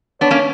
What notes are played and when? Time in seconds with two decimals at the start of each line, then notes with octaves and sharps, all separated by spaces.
0.21 B3 D4 C#5
0.31 A#3 C#4